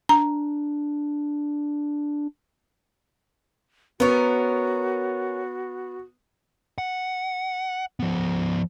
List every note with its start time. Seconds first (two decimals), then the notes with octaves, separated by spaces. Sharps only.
0.09 D4 A#5
4.00 B3 C#4 F#4 A#4
6.78 F#5
8.00 F3 B3